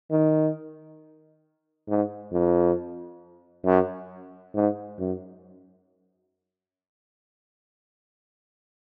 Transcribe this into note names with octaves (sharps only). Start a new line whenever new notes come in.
D#3
G#2
F2
F#2
G#2
F#2